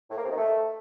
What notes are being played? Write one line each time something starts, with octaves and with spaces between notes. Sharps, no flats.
A2
A#3
C3
D#3
A3